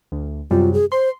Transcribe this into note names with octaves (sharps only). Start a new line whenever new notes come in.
D2
F#2 C3 G3 F4
G#4
C5 C6